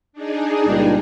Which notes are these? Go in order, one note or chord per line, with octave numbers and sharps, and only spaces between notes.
D4 D#4 G#4
C#2 A#2 G3